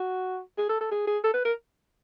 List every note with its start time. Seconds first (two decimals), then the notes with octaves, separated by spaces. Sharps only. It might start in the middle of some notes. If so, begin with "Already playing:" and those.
Already playing: F#4
0.58 G#4
0.69 A4
0.81 A4
0.91 G#4
1.07 G#4
1.24 A4
1.34 B4
1.45 A#4